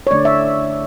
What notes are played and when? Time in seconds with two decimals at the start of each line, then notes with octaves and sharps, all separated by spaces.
0.07 C#5
0.11 D3 A3 D4 D5
0.25 E5